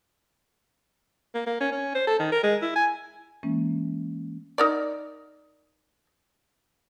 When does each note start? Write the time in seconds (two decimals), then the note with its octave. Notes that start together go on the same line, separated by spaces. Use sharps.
1.35 A#3
1.46 A#3
1.61 C#4
1.72 C#4
1.95 C5
2.07 A4
2.19 D#3
2.32 A#4
2.43 G#3
2.62 E4
2.76 G#5
3.43 E3 G#3 A#3 C#4
4.58 D#4 A#4 D5